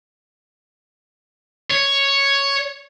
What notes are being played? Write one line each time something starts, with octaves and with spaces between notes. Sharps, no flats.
C#5